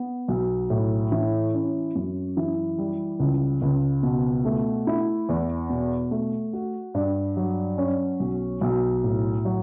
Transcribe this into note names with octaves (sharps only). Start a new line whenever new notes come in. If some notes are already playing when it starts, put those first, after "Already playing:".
Already playing: B3
B1
A2
E3
C#4
F#2
E3
G3
C#2
C#2
B2
A3
E4
E2
B2
A3
F#4
G2
F#3
C#4
B1
B1
A2
F#3